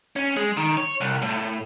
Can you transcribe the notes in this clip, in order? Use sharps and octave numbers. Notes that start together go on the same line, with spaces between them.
C#4
G#3
D#3
C#5
C2
A2